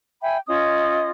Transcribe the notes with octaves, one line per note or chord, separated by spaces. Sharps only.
E5 G5 G#5 B5
C#4 F4 D#5 D#6